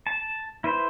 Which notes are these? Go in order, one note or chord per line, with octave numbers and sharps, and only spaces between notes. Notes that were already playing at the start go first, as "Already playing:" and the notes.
A5
E4 B4 C5